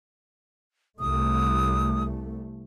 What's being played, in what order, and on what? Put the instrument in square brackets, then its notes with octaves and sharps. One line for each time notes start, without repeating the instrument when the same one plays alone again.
[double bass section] C2 A3 [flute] D#6